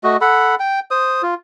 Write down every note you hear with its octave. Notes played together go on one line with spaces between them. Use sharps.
A3 F#4 D#5
A4 F#5 B5
G5
C5 D#6
F4